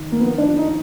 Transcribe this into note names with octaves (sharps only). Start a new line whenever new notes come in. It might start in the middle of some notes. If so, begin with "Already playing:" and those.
Already playing: D#3
A#3
F3 B3
D4
F3
D#4